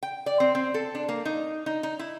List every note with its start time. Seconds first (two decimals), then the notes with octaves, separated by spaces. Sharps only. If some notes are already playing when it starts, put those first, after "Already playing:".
0.03 G5
0.26 D5
0.40 C4
0.55 C4
0.74 A4
0.95 D4
1.09 A#3
1.25 D#4
1.66 D#4
1.83 D#4
1.99 E4